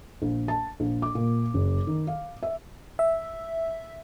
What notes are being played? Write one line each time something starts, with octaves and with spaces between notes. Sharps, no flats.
A#1
A5
A#1
D6
A#2
F#1
D#3
F5
E5
E5